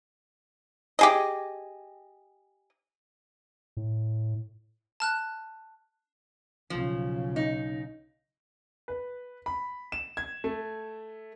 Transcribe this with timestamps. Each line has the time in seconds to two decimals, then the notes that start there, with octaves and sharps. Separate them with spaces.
0.99 G4 G#4 D#5
3.77 A2
5.00 A5 F6 F#6
6.70 B1 C#3 F3
7.36 D#4
8.88 B4
9.46 B5
9.92 E7
10.17 G#6
10.44 A3